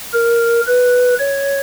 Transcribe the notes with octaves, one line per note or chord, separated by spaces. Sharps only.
A#4
B4
C#5